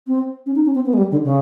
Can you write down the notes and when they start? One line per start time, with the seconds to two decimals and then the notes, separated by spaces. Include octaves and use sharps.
0.07 C4
0.46 C#4
0.55 D#4
0.65 C#4
0.75 C4
0.86 B3
0.93 G#3
0.97 G3
1.12 D3
1.24 C#3